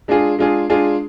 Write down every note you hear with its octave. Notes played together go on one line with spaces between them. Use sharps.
G#3 D4 F4 G#4
G#3 D4 F4 G#4
G#3 D4 F4 G#4